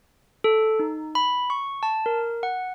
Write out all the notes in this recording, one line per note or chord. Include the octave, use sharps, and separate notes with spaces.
A4
D#4
B5
C#6
A5
A#4
F#5